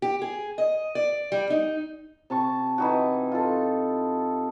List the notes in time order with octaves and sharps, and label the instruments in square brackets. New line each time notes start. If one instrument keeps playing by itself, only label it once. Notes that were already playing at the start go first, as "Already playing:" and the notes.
[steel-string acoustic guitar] G4
G#4
D#5
D5
G3
D#4
[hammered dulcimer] C3 A5 C#6
E3 D#4 F#4
F4 A4